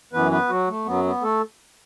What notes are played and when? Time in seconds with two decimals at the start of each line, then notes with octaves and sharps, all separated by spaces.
0.13 F#2 E3 B3 B4
0.31 B3 B4
0.49 F#3 F#4
0.68 A3
0.86 F#2 F#3 B3
1.04 B3
1.22 A3 A4